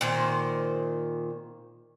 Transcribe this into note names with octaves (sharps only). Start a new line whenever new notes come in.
A#2 D#3 C5